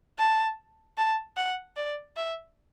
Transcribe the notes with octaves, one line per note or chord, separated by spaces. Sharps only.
A5
A5
F#5
D5
E5